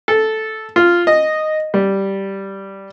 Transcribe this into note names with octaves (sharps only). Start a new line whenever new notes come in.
A4
F4
D#5
G3